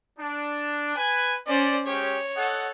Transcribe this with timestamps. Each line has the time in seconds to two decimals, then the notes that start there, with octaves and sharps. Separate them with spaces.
0.19 D4
0.96 B4 G#5
1.47 C#4 C5 D5
1.87 G#3 C#4 G4 C#5
2.36 A4 D#5 F#5